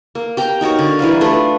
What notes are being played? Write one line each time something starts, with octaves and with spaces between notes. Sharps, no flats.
A#3
G4 G5 A#5
D#4 F#4 A#4 C#5
D3
E3 G3 B4 F5
A3 D4 F4 B4